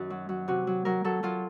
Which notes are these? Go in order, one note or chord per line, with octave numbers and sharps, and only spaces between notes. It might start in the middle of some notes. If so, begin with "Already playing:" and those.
Already playing: F#2 D#3 F#4
F#3
F#3
C3 F#4
F#3
F#3 A#4
F#3 A4
F#3 F4